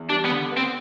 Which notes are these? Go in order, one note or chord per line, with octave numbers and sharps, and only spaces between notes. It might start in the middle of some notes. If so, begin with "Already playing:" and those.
Already playing: E2
G3 D4
B3
D3
B3
C4